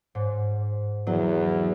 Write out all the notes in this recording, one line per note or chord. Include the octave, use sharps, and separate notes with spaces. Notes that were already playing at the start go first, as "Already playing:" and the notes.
G#2
E2 F#3